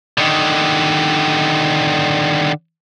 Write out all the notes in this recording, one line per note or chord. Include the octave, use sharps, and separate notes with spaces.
D3 D#3